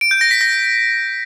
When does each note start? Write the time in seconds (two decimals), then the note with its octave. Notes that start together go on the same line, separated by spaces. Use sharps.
0.01 D7
0.11 G6
0.21 A#6
0.31 B6
0.41 A#6